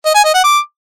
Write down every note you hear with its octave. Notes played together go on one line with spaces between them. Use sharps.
D#5
G#5
D#5
F#5
D6